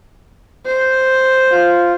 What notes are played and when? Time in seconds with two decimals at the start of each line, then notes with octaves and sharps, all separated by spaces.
0.66 C5
1.52 F4